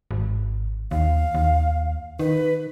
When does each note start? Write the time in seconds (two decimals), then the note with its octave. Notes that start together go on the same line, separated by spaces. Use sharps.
0.11 G#1
0.91 D#2 F5
1.35 D#2
2.19 D#3 B4